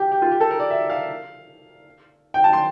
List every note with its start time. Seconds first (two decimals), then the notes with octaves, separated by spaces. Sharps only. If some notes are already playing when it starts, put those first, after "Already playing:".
Already playing: G4
0.12 G4
0.22 F4
0.32 G4
0.40 A4
0.51 A#4
0.59 D5
0.70 E5
0.90 F5
2.34 G5
2.44 A5
2.53 C6